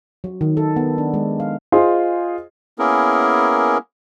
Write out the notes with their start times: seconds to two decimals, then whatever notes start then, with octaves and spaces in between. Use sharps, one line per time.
0.24 F#3
0.41 D#3
0.57 A4
0.76 B3
0.98 D4
1.14 G#3
1.40 F5
1.72 F4 G#4 C5 D#5 C6
2.79 A#3 B3 C#4 E4 G#4 A#4